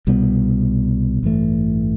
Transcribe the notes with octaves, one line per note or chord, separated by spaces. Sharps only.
C2 B2 G3 B3
A1 G2 E3 A3